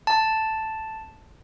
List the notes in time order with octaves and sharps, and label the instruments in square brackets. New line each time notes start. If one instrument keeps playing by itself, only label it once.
[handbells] A5